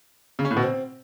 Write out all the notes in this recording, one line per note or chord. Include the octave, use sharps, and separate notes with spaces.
C#3
C#4
A2
B2
C4